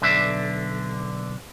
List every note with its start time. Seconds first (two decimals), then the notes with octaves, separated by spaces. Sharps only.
0.02 B1 D3 D4 E5